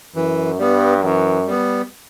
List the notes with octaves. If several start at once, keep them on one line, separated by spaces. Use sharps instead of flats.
F#2 E3
G2 G3 B3
F#2 E3
G3 B3